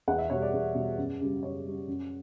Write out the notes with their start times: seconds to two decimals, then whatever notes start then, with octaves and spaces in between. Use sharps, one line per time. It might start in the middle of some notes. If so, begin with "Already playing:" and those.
0.08 E2 F#5
0.18 E5
0.30 B2 G3 C#5
0.42 D5
0.53 E2
0.75 B2 G3
0.97 F#2
1.21 C#3 G3
1.43 F#2 C#5
1.65 C#3 G3
1.87 F#2